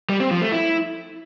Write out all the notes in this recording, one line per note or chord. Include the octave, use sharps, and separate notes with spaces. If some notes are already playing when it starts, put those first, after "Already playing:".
G3
C4
F3
A3
E4